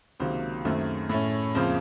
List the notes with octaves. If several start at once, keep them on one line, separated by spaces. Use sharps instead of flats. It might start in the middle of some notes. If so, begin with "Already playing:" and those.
C#2 C3 D#3 F#3 A#3 C5
F#2 D#3 A3 C4
A2 A3 C#4
F2 C#3 F3 A#3 C5